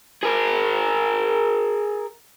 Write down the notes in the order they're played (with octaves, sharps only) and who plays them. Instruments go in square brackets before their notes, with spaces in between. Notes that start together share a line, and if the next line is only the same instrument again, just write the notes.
[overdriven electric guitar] G#4 A#4